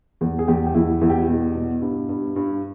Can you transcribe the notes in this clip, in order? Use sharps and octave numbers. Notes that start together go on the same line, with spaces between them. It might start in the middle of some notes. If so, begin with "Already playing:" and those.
E2
G#4
E2 G4
G4
E2 E4
E2 E4
G4
E4
B2
B2
G2
G2
G2